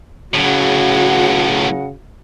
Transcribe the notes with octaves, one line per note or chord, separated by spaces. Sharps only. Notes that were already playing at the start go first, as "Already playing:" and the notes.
C#2 A2 C#3 F#3 F#4 F#5